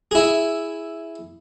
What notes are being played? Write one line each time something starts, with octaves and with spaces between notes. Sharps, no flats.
E4 G#4